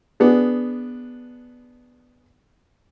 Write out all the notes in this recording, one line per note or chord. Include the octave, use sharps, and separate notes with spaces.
B3 D4 G#4